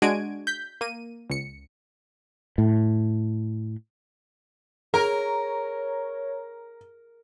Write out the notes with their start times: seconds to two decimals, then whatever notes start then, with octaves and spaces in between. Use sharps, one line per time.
0.02 G#3 D4 F#4 G#6 D7 D#7
0.47 G6 B6
0.81 A#3 D#7
1.30 C#2 C#7
2.58 A2
4.94 G#4 A#4 C#5 A#5